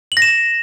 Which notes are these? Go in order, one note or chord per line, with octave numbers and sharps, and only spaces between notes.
F#7
A#6
E7